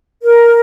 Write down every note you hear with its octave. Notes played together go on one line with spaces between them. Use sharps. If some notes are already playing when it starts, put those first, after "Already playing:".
A#4